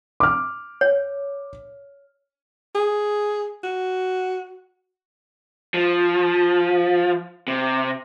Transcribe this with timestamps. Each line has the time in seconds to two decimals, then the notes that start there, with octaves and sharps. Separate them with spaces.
0.20 D6 F6
0.81 C#5
2.75 G#4
3.64 F#4
5.74 F3
7.48 C3